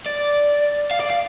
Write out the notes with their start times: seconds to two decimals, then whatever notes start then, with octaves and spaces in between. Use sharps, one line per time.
0.06 D5
0.91 F5
1.00 D5
1.10 F5